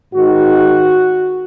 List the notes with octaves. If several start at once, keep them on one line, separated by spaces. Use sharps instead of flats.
G#2 D#3 F#4